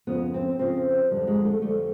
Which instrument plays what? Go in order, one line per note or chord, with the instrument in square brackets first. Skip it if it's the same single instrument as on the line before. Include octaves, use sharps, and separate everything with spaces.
[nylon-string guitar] F2 C#3 F3 B3
C4
F2 C#3 F3 C4
F2 D3 G3
G#3
A3
F2 D3 G3 A3